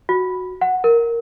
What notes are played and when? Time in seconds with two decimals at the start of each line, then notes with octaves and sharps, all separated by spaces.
0.09 F#4
0.61 F#5
0.84 A#4